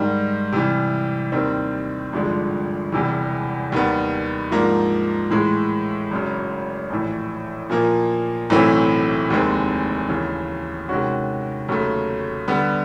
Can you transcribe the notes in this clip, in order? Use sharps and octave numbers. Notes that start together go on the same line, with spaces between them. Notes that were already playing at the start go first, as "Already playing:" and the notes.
Already playing: G#2 D#3 G3
C3 E3 G3
D#2 D#3 G3 C4
G#1 G2 D3 F3 G#3
E1 E2 C3 E3 G3
D#2 D#3 G3 B3
G#2 F3 A#3 D4
A2 E3 G#3
G#1 F#2 C#3
A#1 A2 E3
A#2 F3 A#3
B1 A2 E3 A3 C4
F1 D#2 D#3 G#3 C4
D#2 C#3 E3
C3 D#3 G#3 C#4 F#4
D#2 C#3 F#3 A3
D3 G3 B3